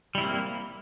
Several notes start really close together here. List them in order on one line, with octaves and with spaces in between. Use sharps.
G3 E4 C4 A#3